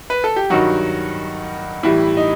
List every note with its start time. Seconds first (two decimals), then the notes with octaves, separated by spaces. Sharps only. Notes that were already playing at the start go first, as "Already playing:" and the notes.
0.10 B4
0.24 A4
0.36 G4
0.50 G2 D#3 F#3 F#4
1.83 A2 E3 G3 E4
2.17 D#4